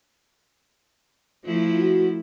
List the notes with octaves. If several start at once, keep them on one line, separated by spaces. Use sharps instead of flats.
F3 A3 E4 F4
F#4